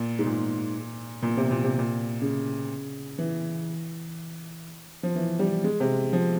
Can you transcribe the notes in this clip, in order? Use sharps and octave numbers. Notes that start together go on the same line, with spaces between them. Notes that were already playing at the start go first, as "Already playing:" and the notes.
Already playing: A#2
G#2
A#2
A#2
C3
A#2
C3
A#2
C#3
E3
F3
E3
G3
G#3
C3
F3